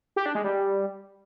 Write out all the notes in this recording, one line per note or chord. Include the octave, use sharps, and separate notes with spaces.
G4
D4
G#3
G3